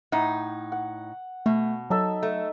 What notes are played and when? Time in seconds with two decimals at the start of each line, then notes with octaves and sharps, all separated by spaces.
0.12 A2 D#4 F#5
0.72 F#5
1.46 B2 A3
1.90 F#3 D#4 A4 E5
2.23 A3